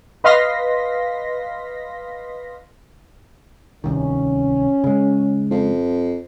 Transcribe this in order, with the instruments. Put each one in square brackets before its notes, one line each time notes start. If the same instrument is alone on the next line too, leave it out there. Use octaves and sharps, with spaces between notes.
[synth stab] B4 D#5 F5 C6 A#6 B6
[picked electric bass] D1 C2 D#3 [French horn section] C#4
[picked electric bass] C#3 G#3
[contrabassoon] F2